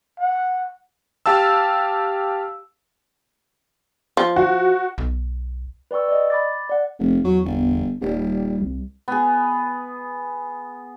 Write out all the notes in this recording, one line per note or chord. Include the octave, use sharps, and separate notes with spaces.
F#5
G4 F5 A5 E6
F3
F#4
B1
B4 D5 G5 C#6 E6
D5 D#5
B5 D6 A6
D5 F#5
F1
E2 F#3
G1
D#1 G3
C2
B3 G#4